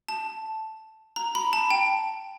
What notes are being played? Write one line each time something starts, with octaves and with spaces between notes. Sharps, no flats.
A5
A#5
B5
A5
G5